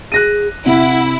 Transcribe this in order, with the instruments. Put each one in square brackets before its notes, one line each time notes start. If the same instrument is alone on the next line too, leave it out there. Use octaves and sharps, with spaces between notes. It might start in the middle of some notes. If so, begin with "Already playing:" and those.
[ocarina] G#4 [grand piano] F#6 A#6 D#7
[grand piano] C3 [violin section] E4 [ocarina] F#5